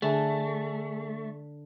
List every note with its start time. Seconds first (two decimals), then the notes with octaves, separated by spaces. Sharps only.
0.02 D3 A3 G#4 E5 G#5